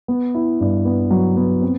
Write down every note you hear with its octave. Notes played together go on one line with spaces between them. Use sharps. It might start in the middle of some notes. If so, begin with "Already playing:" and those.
B3
E4
G2
B3
F#3
B3
C4